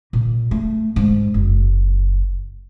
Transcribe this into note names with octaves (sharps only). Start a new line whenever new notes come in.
A#2
A3
G#2
F#1